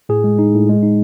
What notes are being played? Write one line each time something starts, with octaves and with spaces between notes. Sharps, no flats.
A2 G#4
G#3
D#4
A2
G#3
D#4